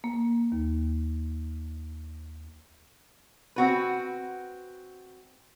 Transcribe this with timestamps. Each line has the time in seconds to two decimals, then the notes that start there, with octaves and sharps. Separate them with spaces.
0.04 A#3
0.52 D#2
3.56 C4 F#4 B4